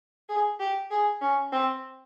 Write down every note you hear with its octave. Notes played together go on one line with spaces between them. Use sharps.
G#4
G4
G#4
C#4
C4